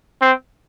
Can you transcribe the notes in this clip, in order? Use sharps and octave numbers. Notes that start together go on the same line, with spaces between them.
C4